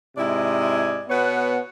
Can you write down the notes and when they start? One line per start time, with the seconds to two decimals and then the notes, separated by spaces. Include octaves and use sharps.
0.18 G#2 C3 E4 D5 D#5 G#5
1.09 B2 B3 B4 C#5 F#5